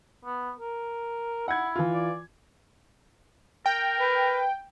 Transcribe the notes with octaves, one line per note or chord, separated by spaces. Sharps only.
B3
A#4
E4 F#5 G#6
E3 F4
D5
A#4 G5
B4